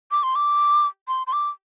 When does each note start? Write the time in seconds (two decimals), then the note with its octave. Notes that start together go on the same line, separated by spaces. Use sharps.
0.11 D6
0.23 C6
0.35 D6
1.08 C6
1.27 C6
1.33 D6